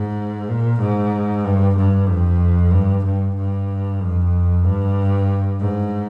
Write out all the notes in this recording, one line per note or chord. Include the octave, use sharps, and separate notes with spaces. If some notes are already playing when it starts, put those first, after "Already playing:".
Already playing: G#2
A#2
G#2
G2
G2
F2
G2
G2
G2
F2
G2
G#2